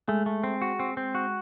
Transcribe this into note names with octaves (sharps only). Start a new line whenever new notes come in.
G#3 A3
A3
C4
F#4
C4
C4
F#4